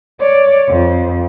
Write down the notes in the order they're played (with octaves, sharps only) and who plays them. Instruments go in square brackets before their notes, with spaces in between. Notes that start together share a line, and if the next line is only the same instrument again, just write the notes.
[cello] C#5 D5
F2